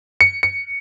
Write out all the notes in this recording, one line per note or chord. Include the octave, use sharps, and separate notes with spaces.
C#7
C#7